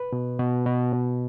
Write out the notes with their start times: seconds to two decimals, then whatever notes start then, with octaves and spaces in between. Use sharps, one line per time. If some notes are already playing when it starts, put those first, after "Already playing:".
Already playing: B4
0.12 B2
0.39 B2
0.66 B2
0.93 B2